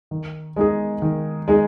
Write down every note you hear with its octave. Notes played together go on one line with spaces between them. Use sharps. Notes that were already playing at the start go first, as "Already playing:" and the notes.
D#3
G#3 D#4 G#4
D#3
G#3 D#4 G#4